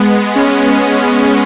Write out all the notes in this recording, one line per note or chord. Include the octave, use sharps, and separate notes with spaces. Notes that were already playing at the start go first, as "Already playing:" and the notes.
Already playing: G#3 B3
C#4